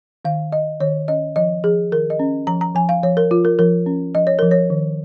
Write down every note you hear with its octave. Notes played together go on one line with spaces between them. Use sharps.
D#3 F5
D#3 D#5
D#3 C#5
C#4 D#5
F3 D#5
F3 G#4
D#3 A#4
D#5
C#4
F3 A#5
A#5
F3 G#5
F5
F3 C#5
A#4
F3 F4
A#4
F3 A#4
C#4
F3 D#5
C#5
F3 A#4
C#5
D#3